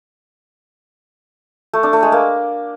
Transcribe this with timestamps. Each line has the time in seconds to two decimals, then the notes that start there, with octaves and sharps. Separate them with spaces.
1.73 A3
1.83 D4
1.93 A3
2.03 G#3
2.12 A#3